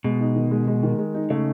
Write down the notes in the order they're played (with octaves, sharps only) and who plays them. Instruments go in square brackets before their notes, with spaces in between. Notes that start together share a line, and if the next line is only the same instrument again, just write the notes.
[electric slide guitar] B2 [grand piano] G#3
[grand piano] D#4
D#3
G#3
G#3
D#3
G#3
D#4
[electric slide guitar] C#3 [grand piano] A3